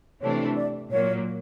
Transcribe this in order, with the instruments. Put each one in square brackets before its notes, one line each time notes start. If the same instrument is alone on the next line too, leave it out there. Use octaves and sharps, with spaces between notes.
[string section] C3 E3 A3 D4 [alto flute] C#5
[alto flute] D5
[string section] A#2 F#3 A#3 [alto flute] C#5